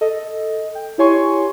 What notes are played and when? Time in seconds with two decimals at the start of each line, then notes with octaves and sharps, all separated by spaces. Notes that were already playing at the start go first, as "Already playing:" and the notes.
0.01 A4 D#5
0.75 G5
0.98 E4 G4 C#5 G#5 C6 C#6